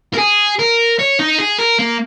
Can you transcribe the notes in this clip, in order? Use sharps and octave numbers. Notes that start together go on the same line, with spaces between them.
A#4
G#4
A#4
C#5
D#4
G#4
A#4
A#3